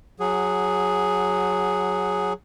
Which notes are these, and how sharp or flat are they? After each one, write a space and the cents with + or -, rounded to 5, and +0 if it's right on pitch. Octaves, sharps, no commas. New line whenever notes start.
F#3 -10 G#4 +0 F#5 +0